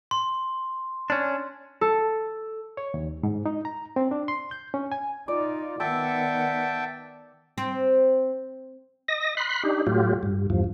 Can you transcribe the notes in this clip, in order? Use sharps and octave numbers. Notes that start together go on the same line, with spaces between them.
C6
C#4 D4
A4
C#5
D#2
G#2
D#4
A#5
C4
D4
C6
G6
C#4
G#5
D#4 F4 D5
D#3 B3 E5 F#5 G5 A5 E6
C4
D#5 A#6
B5 C6 F#6
D4 D#4 G4
A2 F#3 F4 G4
G2
E2 G2 F3